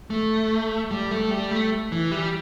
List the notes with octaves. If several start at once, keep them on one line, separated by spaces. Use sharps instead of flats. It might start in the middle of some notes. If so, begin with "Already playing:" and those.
A3
G3
A3
G3
A3
E3
G3